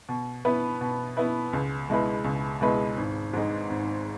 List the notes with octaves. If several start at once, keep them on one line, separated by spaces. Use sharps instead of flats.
B2
B3 E4 B4
B2
B3 E4 B4
C#2
B2 G#3 E4 B4
C#2
B2 G#3 E4 B4
G#1
G#2 G#3
G#1